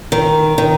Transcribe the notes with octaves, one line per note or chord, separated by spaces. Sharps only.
D#3
D#3